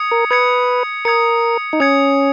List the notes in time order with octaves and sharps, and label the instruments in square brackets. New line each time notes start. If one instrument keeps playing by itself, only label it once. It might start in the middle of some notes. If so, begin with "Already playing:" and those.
Already playing: [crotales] D#6 G#6 C#7
[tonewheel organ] A#4
[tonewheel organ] B4 [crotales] D#6 G#6 C#7
[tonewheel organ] A#4 [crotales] D#6 G#6 C#7
[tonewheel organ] D#4
[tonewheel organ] C#4 [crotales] D#6 G#6 C#7